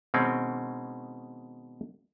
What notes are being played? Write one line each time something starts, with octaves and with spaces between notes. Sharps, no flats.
B2 D#3 G#3 C4 C#4